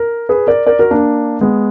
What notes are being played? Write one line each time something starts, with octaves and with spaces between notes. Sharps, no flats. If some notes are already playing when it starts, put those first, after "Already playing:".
Already playing: A#4
G#4 B4
A#4 D5
A#4 D5
F#4 A#4
A#3 D4
G#3 B3